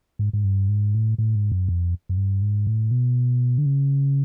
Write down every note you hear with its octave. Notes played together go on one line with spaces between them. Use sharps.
G#2
G#2
G2
G#2
A2
A2
G#2
F#2
F2
F#2
G2
G#2
A2
B2
D3
C#3